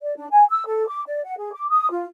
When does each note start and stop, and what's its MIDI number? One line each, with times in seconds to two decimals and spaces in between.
0.02 0.15 74
0.16 0.27 62
0.31 0.45 80
0.50 0.65 88
0.67 0.86 69
0.88 1.02 86
1.06 1.22 74
1.25 1.34 78
1.38 1.53 68
1.53 1.68 86
1.70 1.88 87
1.91 2.05 65